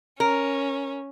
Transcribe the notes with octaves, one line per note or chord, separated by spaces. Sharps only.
C#4 A#4